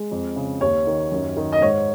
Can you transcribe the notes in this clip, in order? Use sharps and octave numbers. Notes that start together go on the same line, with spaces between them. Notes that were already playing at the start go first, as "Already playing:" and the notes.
Already playing: G#3
F2
C#3
D#2 C#5
D#3
F#2
D#3
D#5
G#2 C#5